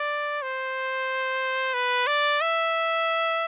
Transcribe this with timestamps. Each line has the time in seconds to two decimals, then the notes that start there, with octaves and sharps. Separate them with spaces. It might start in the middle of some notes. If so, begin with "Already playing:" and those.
Already playing: D5
0.42 C5
1.74 B4
2.07 D5
2.41 E5